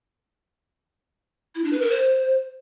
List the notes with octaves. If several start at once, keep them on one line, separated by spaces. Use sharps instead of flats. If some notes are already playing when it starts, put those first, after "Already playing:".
E4
D4
B4
A#4
C5